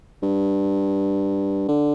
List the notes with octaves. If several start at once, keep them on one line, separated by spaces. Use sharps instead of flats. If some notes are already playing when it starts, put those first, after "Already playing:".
G2
D3